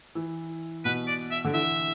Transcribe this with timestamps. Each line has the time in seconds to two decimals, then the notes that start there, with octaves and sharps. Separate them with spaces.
0.15 E3
0.85 B2 B4
1.07 D5
1.31 E5
1.45 D3
1.54 E3 E5